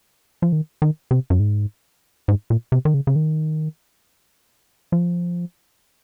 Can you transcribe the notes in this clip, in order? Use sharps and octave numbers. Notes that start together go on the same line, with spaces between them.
F3
D#3
D#3
C3
F#2
G#2
G#2
A#2
C3
D#3
C#3
C#3
D#3
F3